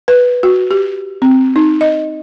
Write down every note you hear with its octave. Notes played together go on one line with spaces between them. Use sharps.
B4
F#4
G4
C4
D#4
D#5